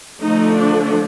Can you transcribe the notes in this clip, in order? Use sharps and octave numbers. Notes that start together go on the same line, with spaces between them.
D3 F3 A3 D#4
D4